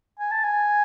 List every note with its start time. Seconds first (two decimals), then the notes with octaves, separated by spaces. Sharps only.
0.19 G#5
0.31 A5
0.44 G#5